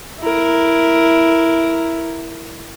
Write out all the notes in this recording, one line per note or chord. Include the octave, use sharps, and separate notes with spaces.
E4 A#4